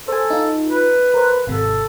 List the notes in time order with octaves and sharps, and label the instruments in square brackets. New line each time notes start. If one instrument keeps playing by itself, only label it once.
[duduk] A4 [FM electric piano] C5 G#5
[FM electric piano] D#4 F4
[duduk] B4
[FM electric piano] A#4 C5
[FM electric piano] G#1 C3 [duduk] A4